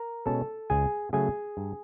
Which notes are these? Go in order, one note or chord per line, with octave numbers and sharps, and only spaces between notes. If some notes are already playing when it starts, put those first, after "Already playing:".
Already playing: A#4 A#5
B2 G#3 C#4 A4 A5
C#2 G#4 G#5
C#3 F#3 A3 G#4 G#5
G2